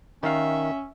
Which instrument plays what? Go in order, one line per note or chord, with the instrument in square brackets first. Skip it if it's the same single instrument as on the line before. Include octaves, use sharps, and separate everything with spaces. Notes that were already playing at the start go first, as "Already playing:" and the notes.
[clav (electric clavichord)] D#3 F5 [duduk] C#4 [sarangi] E5